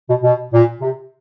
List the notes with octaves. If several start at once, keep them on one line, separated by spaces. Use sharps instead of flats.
B2
B2
A#2
C3